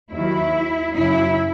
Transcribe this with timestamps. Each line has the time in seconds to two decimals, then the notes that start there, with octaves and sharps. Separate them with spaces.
0.11 D#2 D#3 F#3 E4
0.94 F#2 C#3 F#3 E4